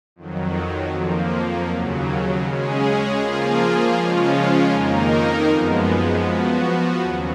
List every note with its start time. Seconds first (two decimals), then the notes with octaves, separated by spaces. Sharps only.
0.16 F2 D#3 F#3
0.92 F2 F3 A#3
1.67 D#2 C#3 F#3
2.44 C#3 G#3 C#4 G#4
3.20 F3 A#3 F4 G#4
3.96 C#3 F3 G#3 C#4 F4
4.72 F2 D#3 A#3 D#4 A#4
5.48 F#2 F3 G#3 B3
6.24 F3 B3 F#4
7.00 D#2 C#3 F#3